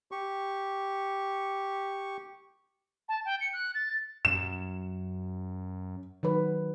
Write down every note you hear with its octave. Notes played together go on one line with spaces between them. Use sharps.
G4 C#6
A5
G5
C#7
F#6
A6
F#2 E7
D#3 F#3 B4